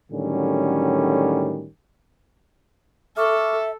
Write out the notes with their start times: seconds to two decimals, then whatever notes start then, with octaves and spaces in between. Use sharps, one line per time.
0.12 A2 D3 D#3 F#3 G3 C#4
3.17 A4 E5 C#6 D6 F6